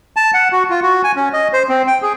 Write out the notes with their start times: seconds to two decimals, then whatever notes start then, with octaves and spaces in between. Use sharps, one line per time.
0.16 A5
0.34 F#5
0.52 F#4
0.70 F4
0.83 F#4
1.04 G#5
1.16 C#4
1.33 D#5
1.53 C5
1.69 C4
1.87 G5
2.02 G#4